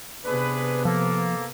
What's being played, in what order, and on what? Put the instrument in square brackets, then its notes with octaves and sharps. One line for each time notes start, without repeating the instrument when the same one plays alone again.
[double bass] C3 B3 [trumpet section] D4 G#4 B4
[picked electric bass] F3 [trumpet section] A#3 A4